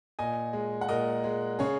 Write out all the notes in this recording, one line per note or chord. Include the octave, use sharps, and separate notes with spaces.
A#2 D#5 G#5
G#3
F#5
A#2 A#4 D#5
G#3
C#3 G#4 C#5